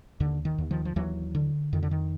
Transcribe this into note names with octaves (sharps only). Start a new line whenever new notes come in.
D#2 D3
D#3
D#2
D#3 F3
F3
D#2 E3 F#3
D3
F2 D#3
D3
D#3